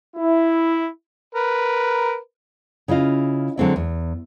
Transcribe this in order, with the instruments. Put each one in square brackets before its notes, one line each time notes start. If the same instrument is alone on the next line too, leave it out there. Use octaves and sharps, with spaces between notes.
[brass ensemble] E4
[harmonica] A#4 B4
[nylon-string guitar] C#3 E4 F4 D#5 F5
D3 F#3 G#3 C4 D4 E4
E2